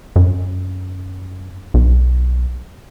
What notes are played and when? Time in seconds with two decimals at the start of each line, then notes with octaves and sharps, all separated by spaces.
0.16 F#2
1.74 B1